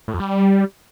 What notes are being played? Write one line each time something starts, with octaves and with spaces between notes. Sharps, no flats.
A2
F2
G3